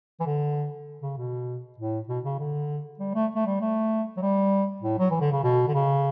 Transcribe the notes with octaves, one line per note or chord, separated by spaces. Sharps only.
E3
D3
C#3
B2
A2
B2
C#3
D3
G3
A3
A3
G3
A3
F#3
G3
A2
F#3
E3
D3
C#3
B2
D3
C#3